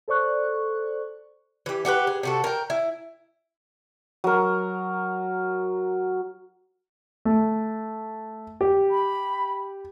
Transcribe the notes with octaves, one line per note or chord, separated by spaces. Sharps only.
A4 C5 D5 C#6 F#6
E3 G4
F#4 G4 A4 B4
G#4
C3 F#4 A4
A#4 G5
E4
F#3 A#4
A3
G4
B5